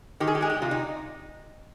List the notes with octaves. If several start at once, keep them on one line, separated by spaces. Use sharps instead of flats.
D#3 G4
G#4
G4
G#3 G#4
G4
C3 F4
D#4